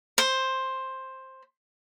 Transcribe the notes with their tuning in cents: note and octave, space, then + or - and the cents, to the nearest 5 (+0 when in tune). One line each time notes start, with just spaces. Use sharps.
C5 +10